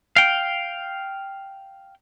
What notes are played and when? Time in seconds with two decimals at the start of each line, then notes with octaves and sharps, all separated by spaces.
0.16 F5 G5